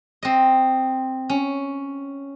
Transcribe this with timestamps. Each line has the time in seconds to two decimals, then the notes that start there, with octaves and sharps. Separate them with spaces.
0.23 C4 D#5
1.30 C#4